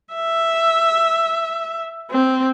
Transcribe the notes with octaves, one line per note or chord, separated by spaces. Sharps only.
E5
C4